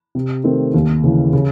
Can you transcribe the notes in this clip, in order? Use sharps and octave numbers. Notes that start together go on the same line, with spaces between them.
C3
D#3 A3 C4
D#2
C#3 E3
C#3